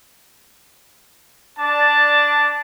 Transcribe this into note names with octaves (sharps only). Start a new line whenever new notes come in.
D4 D5 A5